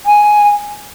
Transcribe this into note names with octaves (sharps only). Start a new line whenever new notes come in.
G#5